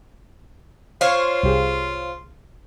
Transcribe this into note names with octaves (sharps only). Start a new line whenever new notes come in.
F4 C5 C#5 F5
C2 G4 G#4